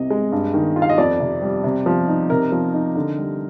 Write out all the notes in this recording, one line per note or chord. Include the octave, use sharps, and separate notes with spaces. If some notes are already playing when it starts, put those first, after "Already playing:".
Already playing: C2 C3 D#5
G#3
G2
D#3
F4
F5
D#5
F2 D5
C3
G3
C3
F3
D#4
C3 A#4
F3
D#4
D3
G3